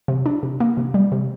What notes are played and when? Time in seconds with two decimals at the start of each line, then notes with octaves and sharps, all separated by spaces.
0.08 C3
0.26 D4
0.43 C3
0.60 A#3
0.77 C3
0.94 G3
1.12 C3